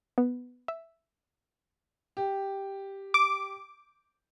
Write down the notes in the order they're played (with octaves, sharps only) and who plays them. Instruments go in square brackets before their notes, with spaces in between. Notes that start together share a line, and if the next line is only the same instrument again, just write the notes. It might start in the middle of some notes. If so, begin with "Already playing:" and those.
[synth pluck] B3
E5
[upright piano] G4
[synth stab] D6